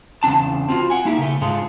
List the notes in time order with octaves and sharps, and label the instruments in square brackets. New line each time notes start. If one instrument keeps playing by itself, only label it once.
[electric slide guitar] E2 C#3 C4 D4 A5
C4 F4 F#4
F#5 G#5
A#3 D#4 E4 G4
C#3 A3
G#2 D3 G#3 A3 F4